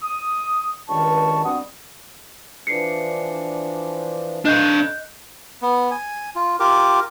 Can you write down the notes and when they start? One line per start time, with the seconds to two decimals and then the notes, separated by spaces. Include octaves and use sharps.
0.02 D#6
0.89 C#2 G2 D#3 A5 C#6
1.45 G2 B2 C4 F#5 D#6
2.67 E3 F3 D4 C7 C#7
4.45 D4 D#4 A4 B4 D#5 F5 F#6 G6
5.62 B3
5.91 G#5
6.36 F4
6.60 F4 G4 A#4 D6